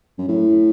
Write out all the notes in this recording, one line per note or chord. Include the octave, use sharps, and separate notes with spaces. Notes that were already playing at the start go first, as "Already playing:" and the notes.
F#2
A2